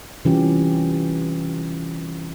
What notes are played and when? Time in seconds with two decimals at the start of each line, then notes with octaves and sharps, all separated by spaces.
0.25 C3 E3 G3 C#4 F4 G4